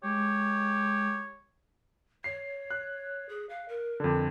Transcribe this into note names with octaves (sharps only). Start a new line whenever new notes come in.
G#3 G4 C#5
C#5 C7
F#6
G#4
F5
A#4
F2 D3